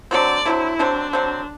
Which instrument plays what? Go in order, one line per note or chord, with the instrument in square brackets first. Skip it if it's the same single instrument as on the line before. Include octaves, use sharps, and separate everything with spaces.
[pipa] D3 F#3 C4 [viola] D5
[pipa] D3 F#3 C4 [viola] E4
[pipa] D3 F#3 C4 [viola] D4
[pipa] D3 F#3 C4